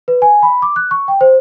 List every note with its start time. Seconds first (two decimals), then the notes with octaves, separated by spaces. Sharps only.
0.08 B4
0.22 G#5
0.43 B5
0.62 D6
0.76 F#6
0.91 C#6
1.08 G5
1.21 C5